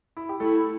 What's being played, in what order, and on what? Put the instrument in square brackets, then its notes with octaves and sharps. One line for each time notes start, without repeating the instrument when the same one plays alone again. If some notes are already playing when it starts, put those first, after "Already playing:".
[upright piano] E4
G4
[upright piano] A3 A4 [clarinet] E4